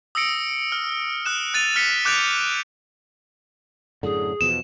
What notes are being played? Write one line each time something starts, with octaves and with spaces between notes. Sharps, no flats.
D#6 E6 A#6 C#7 D7
F6
D#6 F#6 E7
F#6 A6 D#7 F7
F6 B6 C#7
D6 F#6 G6 A6 D7 F7
F#2 A2 D3 G#4
E2 B2 F3 E7